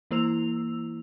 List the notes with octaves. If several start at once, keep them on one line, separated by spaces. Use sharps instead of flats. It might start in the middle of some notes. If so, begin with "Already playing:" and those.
E3 A#3 E4 C5 E6 F7